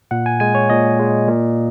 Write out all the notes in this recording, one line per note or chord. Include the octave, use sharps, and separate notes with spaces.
A#2 F#5
G#5
G#3 G#5
C#5
A#2 D#5
G#3
A#2